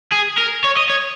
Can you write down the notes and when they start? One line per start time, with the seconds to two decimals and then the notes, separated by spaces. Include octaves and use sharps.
0.12 G#4
0.38 A#4
0.64 C#5
0.77 D#5
0.90 C#5